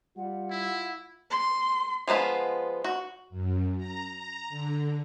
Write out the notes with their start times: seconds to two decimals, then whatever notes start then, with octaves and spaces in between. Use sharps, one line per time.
0.17 G3 F4 F#5
0.51 E4
1.31 C6
2.08 F3 G#3 B3 F4
2.84 F#4
3.30 F#2
3.77 A#5
4.13 A#5
4.48 D3